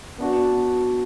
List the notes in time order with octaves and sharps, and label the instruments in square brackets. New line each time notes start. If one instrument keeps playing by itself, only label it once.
[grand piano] B3 D4 F#4